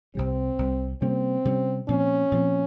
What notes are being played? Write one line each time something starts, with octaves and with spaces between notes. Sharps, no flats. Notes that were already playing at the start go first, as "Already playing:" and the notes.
C2 C3 G3 C4
C2 C3 G3
C3 G3 A#3 C4 C#4
C3 G3 A#3 C#4
A#2 F3 C4 C#4
A#2 F3 C4